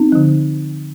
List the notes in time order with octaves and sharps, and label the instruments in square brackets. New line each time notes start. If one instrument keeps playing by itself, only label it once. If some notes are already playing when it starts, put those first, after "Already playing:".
Already playing: [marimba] C4 D#4
D3 F3